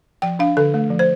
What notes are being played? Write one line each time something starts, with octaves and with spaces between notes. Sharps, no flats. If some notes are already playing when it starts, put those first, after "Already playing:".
F3 G5
D4 F5
D3 A4
A3
F3
C5